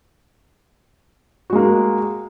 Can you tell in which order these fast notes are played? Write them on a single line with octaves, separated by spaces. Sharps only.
F#4 G#3 A#3